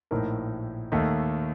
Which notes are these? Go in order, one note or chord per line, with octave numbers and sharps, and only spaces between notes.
A#1 A2 A3 D#4 A#4
D#2 D#3 A3 D#4